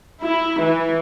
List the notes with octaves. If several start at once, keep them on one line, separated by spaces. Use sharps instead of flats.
E4
E3